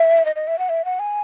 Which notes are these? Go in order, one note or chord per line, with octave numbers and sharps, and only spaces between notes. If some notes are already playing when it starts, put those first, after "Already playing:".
Already playing: E5
D#5
D#5
E5
F#5
E5
F#5
G#5